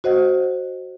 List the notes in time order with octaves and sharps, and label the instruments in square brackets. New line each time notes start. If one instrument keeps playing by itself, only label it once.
[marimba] F#4 C5 D#5 F#5